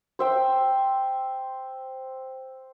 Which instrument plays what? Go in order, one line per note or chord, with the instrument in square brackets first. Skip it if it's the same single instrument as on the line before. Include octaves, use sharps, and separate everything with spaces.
[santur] C5 E5 G5